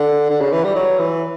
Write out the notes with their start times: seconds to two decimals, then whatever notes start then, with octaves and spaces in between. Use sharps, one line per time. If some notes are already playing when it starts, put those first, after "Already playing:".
Already playing: D3
0.30 D3
0.41 C#3
0.53 E3
0.64 G3
0.75 F#3
0.99 E3